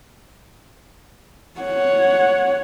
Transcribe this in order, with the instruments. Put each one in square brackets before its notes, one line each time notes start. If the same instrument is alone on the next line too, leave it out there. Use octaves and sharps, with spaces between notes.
[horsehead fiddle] C#5 F#5